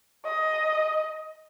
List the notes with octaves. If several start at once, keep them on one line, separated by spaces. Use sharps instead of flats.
D#5